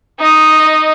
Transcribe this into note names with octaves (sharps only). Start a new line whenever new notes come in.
D#4 D#5